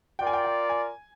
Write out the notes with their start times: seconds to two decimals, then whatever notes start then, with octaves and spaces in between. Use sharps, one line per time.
0.19 F4 A#4 D5 G5
0.27 G#5
0.33 G5
0.44 G5
0.69 G#5